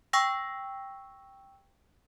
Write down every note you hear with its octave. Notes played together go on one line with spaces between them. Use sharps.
G5 C#6 E6 A#6